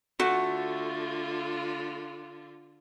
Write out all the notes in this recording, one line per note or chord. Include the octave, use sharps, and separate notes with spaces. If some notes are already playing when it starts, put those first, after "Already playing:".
D3 A3 F4 F#4